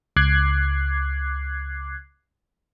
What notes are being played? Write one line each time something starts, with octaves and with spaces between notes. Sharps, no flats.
C#2 D6 F#6 G#6 C7